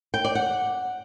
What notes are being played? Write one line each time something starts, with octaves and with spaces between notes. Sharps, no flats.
G5
D5
F#5